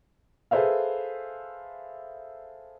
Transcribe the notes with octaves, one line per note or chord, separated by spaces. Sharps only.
G#4 A4 B4 C5 E5 F5